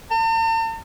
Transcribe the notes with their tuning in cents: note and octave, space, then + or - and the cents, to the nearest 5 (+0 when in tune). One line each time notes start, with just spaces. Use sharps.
A5 +45